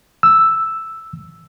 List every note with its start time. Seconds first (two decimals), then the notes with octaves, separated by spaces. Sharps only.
0.23 E6